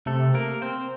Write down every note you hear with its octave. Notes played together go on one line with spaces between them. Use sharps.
C3 A3 A4
A#3 A#4
C4 C5